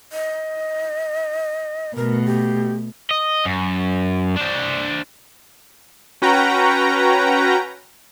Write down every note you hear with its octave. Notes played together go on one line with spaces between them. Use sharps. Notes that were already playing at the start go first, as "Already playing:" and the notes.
D#5
B2 A3 A#4
G4
D#5
F#2
D4 C5
C#4 F#4 B4 G5 A#5